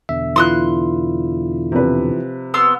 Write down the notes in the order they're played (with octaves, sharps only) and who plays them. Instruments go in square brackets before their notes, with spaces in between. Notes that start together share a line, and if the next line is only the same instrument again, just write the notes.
[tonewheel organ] E2 B2 D3 [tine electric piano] E5
[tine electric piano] E3 E4 F4 [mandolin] C6 D#6 F#6
[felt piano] C3 F3 B4
[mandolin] B3 C6 E6